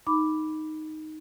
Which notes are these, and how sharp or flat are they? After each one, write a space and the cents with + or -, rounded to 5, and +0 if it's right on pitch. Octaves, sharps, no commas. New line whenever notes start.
D#4 +0 B5 +0 D6 +0